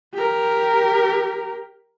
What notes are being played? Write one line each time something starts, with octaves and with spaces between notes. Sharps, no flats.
G4 A#4